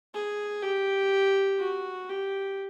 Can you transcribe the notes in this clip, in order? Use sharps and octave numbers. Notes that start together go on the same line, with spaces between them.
G#4
G4
F#4
G4